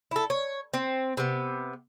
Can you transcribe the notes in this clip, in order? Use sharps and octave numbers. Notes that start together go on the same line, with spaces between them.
E4 A4
C#5
C4
C3 B3